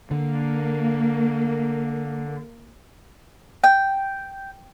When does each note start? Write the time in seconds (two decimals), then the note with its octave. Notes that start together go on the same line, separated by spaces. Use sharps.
0.11 D3 A#3
3.64 G5